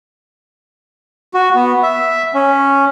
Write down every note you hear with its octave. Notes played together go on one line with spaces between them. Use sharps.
F#4
B3
E5
C#4